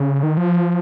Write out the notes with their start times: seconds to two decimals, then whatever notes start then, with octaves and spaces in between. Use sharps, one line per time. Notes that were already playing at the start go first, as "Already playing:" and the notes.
Already playing: C#3
0.23 D#3
0.37 F3